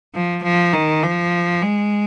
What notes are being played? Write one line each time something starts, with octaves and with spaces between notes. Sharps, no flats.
F3
F3
D#3
F3
G#3